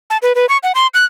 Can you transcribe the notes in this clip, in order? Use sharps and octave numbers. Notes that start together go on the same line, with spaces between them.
A5
B4
B4
C#6
F#5
C6
F#6